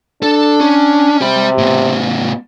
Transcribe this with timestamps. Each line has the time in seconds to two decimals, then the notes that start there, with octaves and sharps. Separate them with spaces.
0.23 D4 A4
0.60 C#4
1.21 C3 G4 B5
1.58 A2 B3